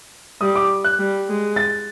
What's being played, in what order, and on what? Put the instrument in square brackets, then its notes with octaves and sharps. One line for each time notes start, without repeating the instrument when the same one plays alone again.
[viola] G3 [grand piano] D#6
[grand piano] D6
F#6
[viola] G3
G#3
[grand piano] A6